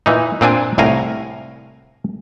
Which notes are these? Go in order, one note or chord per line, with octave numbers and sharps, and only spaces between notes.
A#2 E3 D#4
A#2 C4 D4 G#5
C2 A2 F5 G#5 A#5